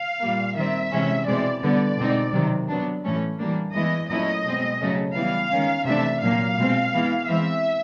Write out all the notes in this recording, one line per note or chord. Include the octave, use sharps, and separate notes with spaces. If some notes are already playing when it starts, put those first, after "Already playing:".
Already playing: F5
A#2 G3 A#3
D#3 G3 C4 E5
C3 E3 G#3 C#4
B2 G#3 C4 E4 D5
D3 G3 B3 D5
B2 G#3 C4 D#4
C3 D#3 F#3
F#3 B3 D4
A2 E3 A3 C#4
E3 G3 A#3 D4
E3 G#3 B3 E4 D#5
A#2 F#3 A3 C#4 E4 D#5
B2 G#3 C4
C#3 F#3 A3 C#4
E3 G3 B3 E4 F5
D#3 G#3 C#4
C3 E3 A3 D4 E5
A#2 F#3 A#3 F5
B2 G#3 C4
E3 G#3 B3 E4
E3 G#3 C4 E5